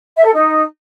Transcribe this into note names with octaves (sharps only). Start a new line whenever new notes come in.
E5
A4
D#4